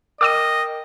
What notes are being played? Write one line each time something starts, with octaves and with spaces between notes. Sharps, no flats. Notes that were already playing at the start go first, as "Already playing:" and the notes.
A#4 D#5 G5 D6 E6 D#7